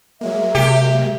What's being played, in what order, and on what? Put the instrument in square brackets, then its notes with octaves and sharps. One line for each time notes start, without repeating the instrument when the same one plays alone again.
[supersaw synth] F#3 G#3 A#3 [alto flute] E5
[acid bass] C3 [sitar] G4